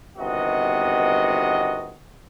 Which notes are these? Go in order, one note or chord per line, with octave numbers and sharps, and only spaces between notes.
G1 C3 D#3 B3 F#4 D#5